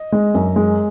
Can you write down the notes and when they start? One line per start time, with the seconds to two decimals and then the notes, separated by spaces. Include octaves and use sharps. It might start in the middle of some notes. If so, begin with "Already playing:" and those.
Already playing: D#5
0.12 G#3
0.35 F#2
0.56 G#3